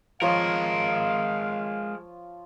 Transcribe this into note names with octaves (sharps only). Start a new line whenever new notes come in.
F3 G#3 F4 A#4 C#5 F5